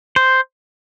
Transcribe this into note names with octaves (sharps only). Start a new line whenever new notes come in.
C5